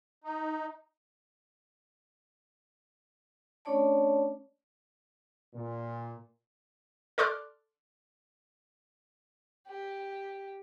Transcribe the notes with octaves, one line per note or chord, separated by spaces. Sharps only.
D#4
A3 C#4 D4 C#5 D5 A5
A#2
A4 D5 C6 D6 F6 F#6
G4